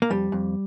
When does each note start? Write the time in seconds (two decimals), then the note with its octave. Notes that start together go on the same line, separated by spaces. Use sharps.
0.02 A#3
0.10 F2 G3
0.32 F2